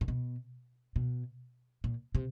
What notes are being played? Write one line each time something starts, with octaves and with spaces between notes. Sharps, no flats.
A#2
B2
B2
A#2
C3